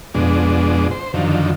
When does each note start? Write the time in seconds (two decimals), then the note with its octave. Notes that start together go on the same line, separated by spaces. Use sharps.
0.14 F2 B2 G#3 D4
0.91 C5
1.14 F#2 D3 D#3 F3